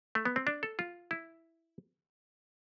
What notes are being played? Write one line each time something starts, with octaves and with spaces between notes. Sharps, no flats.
A3
B3
C4
D4
A4
F4
E4